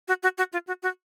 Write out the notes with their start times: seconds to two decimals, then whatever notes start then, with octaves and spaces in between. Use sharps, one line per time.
0.08 F#4
0.23 F#4
0.38 F#4
0.53 F4
0.67 F#4
0.83 F#4